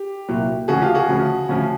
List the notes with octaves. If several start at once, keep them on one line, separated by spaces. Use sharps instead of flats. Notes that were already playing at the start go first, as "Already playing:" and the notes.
Already playing: G4
C2 A#2 F#3
D2 C#3 F3 F#4 G#4
F4 G4
F#4 G#4
D2 C#3 F3
D2 C#3 F3